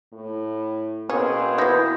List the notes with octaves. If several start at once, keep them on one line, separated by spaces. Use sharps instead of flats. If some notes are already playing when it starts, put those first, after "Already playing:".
A2
B2 A#3 C4 C#4 G#4
E3 E4 D#6 G6 A#6